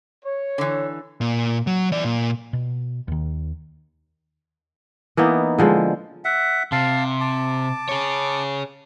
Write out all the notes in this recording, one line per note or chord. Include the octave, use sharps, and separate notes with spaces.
C#5
D3 E3
A#2
F#3
E3 D5
A#2
B2
D#2 D#3
E3 A#3 B3 D#4
D3 F3 G#3
E5 F#5
C3 F5 A5
A5 D6
G#4 C#5